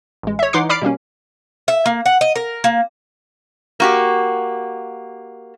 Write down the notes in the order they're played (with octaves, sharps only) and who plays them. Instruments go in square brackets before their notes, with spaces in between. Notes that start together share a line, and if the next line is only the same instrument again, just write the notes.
[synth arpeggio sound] A1 G#3
C#5 E5
E3 D#4 F#5 C6 D6 C7
D5 B5 D6 F6 C7 D7
B2 G3 A#3 C#4
[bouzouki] E5
A#3
F#5
D#5
A#4
A#3
[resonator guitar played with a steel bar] A#3 F#4 G4